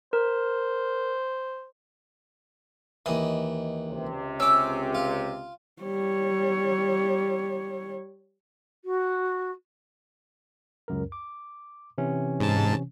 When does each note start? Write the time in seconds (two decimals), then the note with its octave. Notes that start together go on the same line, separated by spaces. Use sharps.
0.13 A#4 C5
3.06 D#2 E3 D#5
3.88 C#2 C3
4.40 C#4 D6 E6
4.95 F4
5.82 G3 C#5
8.85 F#4
10.88 C#2 F#2 A#4
11.12 D6
11.98 C3 E3 C#4
12.40 G#2 A5